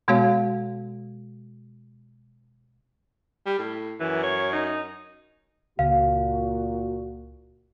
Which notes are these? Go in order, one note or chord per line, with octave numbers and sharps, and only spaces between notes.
B2 G#3 B3 F#4 C#5 F5
G3
A2
F#2 E3
C#5
D#4
C#2 A#2 F#4 F5